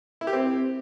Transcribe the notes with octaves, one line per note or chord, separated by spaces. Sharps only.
E4
G4
C4